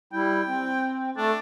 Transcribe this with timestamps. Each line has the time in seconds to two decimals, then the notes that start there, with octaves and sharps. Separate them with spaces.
0.13 G3 E4 G5
0.46 C4
1.17 A3 D4 A4